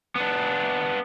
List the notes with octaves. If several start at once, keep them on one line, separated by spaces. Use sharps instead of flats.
B3 D4